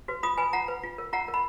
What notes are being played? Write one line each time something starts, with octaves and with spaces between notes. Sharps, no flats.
F#4 B4
F4 B5 D#6
B4 G#5 B5
F4 F#5 A#5
B4
F4
A#4
F4 F#5 A#5
A#4
B5